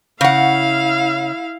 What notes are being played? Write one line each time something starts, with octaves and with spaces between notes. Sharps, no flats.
C#3 E4 F5 F#5